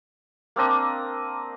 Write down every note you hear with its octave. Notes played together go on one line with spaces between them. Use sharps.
A#3 C4 D4 D#5